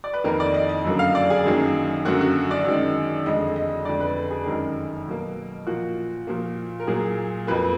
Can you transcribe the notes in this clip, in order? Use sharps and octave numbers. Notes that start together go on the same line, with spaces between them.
D5
B4
F2 D#3 A#3 A#4
D5
D#5
D#5
F#2 D3 F#3 A#3
F5
D5
G#4
F#2 D#3 F#3 A#3
F#2 D3 F#3 A#3 F#4
F#4
D5
F#2 D#3 G#3
F2 D3 G#3 D#5
D#5
F2 D3 G#3 D5
B4
G#4
F#2 D#3 G#3 A#4
B2 F#3 A#3
A#2 F3 A#3 F#4
A#2 F3 A#3
A#4
A#2 F#3 A#3 G#4
F2 F3 A#3 B4